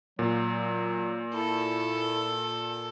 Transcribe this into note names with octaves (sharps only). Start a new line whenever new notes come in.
A#2 F#3
E4 A4